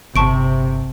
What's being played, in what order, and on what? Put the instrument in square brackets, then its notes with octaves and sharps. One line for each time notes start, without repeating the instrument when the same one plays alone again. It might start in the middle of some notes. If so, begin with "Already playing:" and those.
[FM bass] G1 [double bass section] C3 [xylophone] A5 C#6 D7